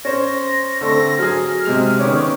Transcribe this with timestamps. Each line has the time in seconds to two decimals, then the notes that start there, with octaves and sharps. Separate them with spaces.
0.05 C#4 C5 A#6
0.81 D3 A3 C4 A#6
1.19 F#3 G#4 F6
1.65 C3 G#3 F7
1.99 D#3 B3 C#4 D6